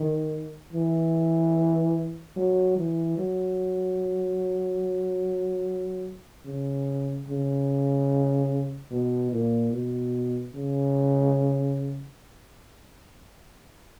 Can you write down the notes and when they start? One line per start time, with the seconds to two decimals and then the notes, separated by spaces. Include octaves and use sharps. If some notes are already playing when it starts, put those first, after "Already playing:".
Already playing: D#3
0.73 E3
2.36 F#3
2.77 E3
3.18 F#3
6.45 C#3
7.28 C#3
8.91 B2
9.32 A#2
9.73 B2
10.55 C#3